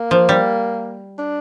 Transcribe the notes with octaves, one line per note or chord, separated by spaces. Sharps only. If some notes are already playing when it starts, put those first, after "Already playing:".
Already playing: A#3
F3
G3
D4